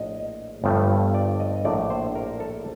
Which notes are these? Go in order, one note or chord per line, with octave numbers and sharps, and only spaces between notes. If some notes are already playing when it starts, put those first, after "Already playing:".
Already playing: A#1 A2 A3 D#5
G1 G2 F3 A3
D5
D#5
A#1 A2 A3 D5
C5
A#4
A4